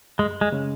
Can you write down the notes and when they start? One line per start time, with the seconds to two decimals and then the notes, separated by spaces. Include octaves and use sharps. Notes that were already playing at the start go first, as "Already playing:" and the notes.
0.19 F#2 G#3
0.41 G#3
0.52 C#3 G#3 C#4